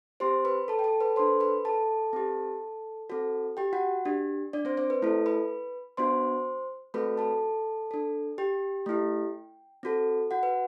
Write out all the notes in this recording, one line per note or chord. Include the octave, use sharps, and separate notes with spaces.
C4 G4 C5 C6
B4 B5
A4 A5
G5
A4 A5
B4 B5
D4 A4 C5 C6
B4 B5
A4 A5
C4 G4
C4 F#4 A4
G4 G5
F#4 F#5
D4 G4
D4 D5
C4 C5
C4 C5
B4
A3 E4 A4
B4 B5
B3 D4 F#4 C5 C6
A3 C4 F#4 A4 B4 B5
A4 A5
D4 A4
G4 G5
A3 E4 G4
C4 F#4 A4
F#4 F#5
B4